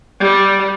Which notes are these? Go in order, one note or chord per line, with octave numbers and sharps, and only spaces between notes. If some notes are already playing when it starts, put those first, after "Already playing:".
G3